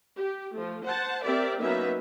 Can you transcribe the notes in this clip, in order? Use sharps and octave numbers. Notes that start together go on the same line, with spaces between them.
G4
F3 A3
C5 F#5 A5
C4 G4 A#4 D5 E5
F#3 A#3 B3 C#4 D#4 E5